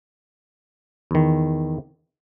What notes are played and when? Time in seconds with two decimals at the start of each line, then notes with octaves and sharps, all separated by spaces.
1.11 E2 D#3